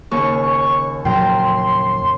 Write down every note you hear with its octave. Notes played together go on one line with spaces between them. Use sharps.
D#2 C#3 C#6
F2 A#2 F#3 G5 A#5 C6